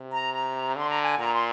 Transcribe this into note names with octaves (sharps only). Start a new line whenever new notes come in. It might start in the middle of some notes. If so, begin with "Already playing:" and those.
Already playing: C3
A#5
A#5
D3 C6
A#5
G#5
A#2 A#5
C6